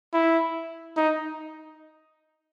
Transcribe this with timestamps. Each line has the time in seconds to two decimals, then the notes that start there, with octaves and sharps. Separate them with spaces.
0.13 E4
0.97 D#4